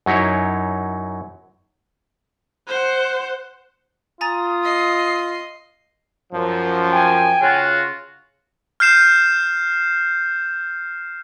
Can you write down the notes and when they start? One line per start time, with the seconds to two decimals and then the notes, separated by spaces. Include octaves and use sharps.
0.06 F#2 F#3 D#4 E4 C#5
2.68 C5 F#5
4.21 F4 G#5 A#5 D#6 A6
4.64 D#5 C7
6.32 F#2 F3
6.93 G5 G#5
7.41 C#3 F4 F#4
8.80 F6 G6 C7 E7